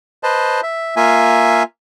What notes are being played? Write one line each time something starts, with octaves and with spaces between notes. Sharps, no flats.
B4 C5 D#5 A5
E5
A#3 F4 E5 G#5